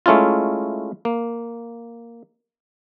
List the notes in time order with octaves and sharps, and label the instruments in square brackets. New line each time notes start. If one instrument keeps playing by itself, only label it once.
[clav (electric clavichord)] G#3 A3 C#4 E4 F4
A#3